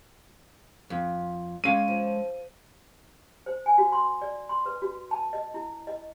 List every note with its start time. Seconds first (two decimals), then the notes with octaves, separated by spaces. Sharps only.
0.90 F2
1.64 G#3 C#4 F5 D#7
1.88 F3
3.46 C5
3.66 G#5
3.78 F#4
3.92 C6
4.22 D5
4.49 C6
4.66 B4
4.82 F#4
5.11 A5
5.33 D#5
5.54 E4
5.87 D#5